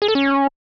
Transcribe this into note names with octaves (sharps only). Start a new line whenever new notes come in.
G#4
A4
C#4